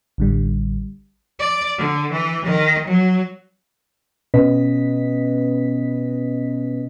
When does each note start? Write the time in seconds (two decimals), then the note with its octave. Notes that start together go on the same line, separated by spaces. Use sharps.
0.18 A1 D3 G3
1.39 D5
1.78 D3
2.12 E3
2.46 D#3
2.88 F#3
4.34 B2 B3 C#4 B4 D#5 B6